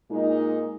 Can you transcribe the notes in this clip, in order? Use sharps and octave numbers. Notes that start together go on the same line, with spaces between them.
A#2 G#3 D#4